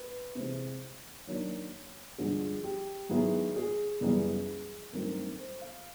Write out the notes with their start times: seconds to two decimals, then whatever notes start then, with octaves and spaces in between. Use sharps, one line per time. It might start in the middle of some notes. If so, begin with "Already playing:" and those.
Already playing: B4
0.35 C3 E3 G#3 C5
1.27 D#3 F#3 A#3 D4 C#5
2.18 G2 D3 F3 G#3 G#4
2.64 G4
3.09 G#2 D#3 F#3 B3 E4 G#4
3.56 G#4
4.01 F#2 C#3 E3 G3 B3 G#4
4.92 G2 D#3 F#3 A3 C4 A#4
5.38 C5
5.61 F5